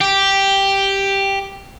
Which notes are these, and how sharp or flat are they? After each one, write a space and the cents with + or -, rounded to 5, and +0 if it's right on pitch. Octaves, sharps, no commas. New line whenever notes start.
G4 +0 G5 +0